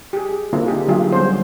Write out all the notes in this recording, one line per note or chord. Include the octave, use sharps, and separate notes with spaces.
G4 G#4
G#4
D3 A#3 C4 E4 F4
D#4 G4 G#4
D3 F#3 A3 F4 G4 G#4
D3 G3 B3 C#4 C5